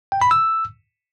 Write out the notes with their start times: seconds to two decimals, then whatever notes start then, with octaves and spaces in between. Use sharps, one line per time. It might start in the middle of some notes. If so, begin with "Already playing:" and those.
0.12 G5
0.21 B5
0.31 E6